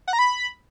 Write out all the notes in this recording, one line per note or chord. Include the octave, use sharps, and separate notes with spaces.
F#5
A#5
B5